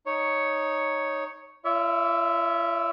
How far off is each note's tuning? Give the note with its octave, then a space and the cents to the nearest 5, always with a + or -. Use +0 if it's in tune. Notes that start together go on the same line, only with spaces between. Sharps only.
D#4 +0 C#5 +0
F4 -45 C#5 +40 E5 -5